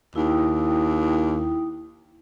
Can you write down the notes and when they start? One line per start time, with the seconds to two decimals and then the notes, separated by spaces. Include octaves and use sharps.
0.16 D#2 E4 G5 D#6